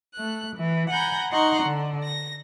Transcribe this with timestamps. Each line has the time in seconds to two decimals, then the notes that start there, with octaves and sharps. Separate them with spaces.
0.15 A3 F#6
0.56 E3
0.91 F#5 G#5 A#5 B5 G6 A#6
1.31 D#4 F#5 A#5 C6 C#6
1.63 D3
2.03 A#6